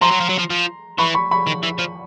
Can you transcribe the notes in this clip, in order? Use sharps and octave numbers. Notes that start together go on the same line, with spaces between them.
F3 A#5 C6
F#3
F3
F#3
F3
F3
E3 B5 C#6
B5 C#6
B5 C#6
D#3
E3
F3